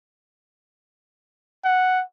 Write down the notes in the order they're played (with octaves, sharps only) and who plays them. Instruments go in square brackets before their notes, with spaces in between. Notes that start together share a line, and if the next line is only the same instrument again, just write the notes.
[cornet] F#5